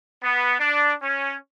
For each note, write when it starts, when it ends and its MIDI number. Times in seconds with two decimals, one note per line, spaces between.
0.24 0.57 59
0.60 0.93 62
1.03 1.36 61